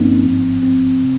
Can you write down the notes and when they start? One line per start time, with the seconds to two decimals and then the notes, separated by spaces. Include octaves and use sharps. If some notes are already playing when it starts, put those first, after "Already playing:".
Already playing: G1 G2 F3 A#3 C4 C#4 D#4
0.25 G#1 G#2 F3
0.63 C4
1.03 C3